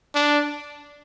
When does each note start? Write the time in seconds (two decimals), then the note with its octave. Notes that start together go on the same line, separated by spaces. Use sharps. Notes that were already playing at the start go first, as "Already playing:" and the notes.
0.15 D4